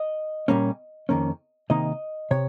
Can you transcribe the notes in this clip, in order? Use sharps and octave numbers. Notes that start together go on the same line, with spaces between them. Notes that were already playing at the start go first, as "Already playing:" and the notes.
Already playing: D#5
A#2 G3 A#3 C#4
F2 D#3 A#3 C#4
C3 D#3 A#3 D#4 D#5
C3 C#5